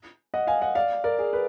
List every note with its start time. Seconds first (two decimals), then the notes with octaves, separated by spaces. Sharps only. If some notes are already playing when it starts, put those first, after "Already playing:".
0.34 D#5 F#5
0.47 F5 G#5
0.62 D#5 F#5
0.75 D5 F5
1.04 A#4 D5
1.19 G#4
1.33 B4